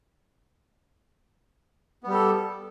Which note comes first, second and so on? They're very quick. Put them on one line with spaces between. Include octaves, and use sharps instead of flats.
B3 G3 G4 A4